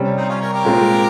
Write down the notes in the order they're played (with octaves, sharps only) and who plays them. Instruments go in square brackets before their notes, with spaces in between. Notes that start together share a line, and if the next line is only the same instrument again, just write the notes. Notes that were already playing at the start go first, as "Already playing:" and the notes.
Already playing: [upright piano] C3 G3 C#4
[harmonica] C4 D#4
C#4 F4
A#4 C#5
G4 A#4
[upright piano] A#2 G#3 C4 F4